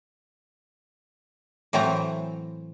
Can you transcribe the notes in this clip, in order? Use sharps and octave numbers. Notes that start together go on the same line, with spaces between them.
A2 E3 F#3 C4 A#5